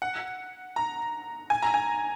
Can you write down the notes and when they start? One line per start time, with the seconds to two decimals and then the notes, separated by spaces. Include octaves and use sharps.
0.02 F#5
0.76 A#5
1.50 G#5
1.62 A#5
1.74 G#5